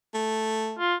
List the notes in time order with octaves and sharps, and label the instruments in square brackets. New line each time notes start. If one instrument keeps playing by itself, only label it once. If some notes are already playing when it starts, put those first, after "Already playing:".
[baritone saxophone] A3
[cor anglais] F4